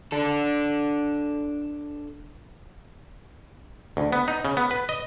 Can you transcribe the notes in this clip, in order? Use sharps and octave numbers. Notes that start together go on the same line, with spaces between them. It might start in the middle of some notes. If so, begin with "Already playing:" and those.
D4 A4
D2
B3
D#4
C#3
B3
B4
D#5